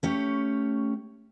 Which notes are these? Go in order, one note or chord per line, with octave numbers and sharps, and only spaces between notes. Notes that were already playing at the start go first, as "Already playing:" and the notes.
A3 C#4 G4 C#5